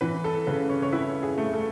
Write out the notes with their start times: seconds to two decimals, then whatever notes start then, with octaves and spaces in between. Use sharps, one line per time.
0.01 E3 B4
0.24 A4
0.47 C#3 B4
0.69 C#5
0.82 C#5
0.92 E4 B4
1.23 G#4
1.38 A3
1.53 A4